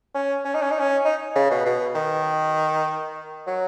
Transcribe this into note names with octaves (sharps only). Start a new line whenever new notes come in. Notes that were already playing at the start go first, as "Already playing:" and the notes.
C#4
C#4
D#4
C#4
D#4
C#4
D#4
C#3
B2
B2
D#3
F#3